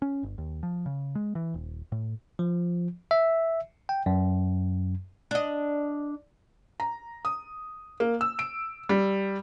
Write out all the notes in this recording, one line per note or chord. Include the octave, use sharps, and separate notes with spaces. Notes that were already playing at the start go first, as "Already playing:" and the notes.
C#4
G1
D#2
F3
C#3
G#3
E3
D#1
A2
F3
E5
G5
F#2
D4 D#5
A#5
D#6
A#3
E6
D7
G3